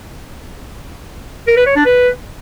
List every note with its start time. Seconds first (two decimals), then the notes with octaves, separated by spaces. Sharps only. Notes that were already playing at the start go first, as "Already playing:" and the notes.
1.47 A#4
1.57 B4
1.66 C#5
1.76 D4
1.85 B4